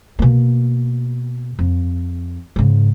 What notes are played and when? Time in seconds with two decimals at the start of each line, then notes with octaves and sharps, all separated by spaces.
0.19 B2 A#3
1.59 F2
2.56 G#2 C#3